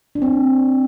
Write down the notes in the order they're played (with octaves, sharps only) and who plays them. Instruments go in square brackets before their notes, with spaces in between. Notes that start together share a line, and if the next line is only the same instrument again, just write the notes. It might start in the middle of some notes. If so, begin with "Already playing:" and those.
[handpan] D4
C4